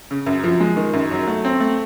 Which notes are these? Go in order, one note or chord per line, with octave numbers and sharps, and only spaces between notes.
C#3
F#2
F3
G#3
D#3
F#2
F#3
A3
C4
A3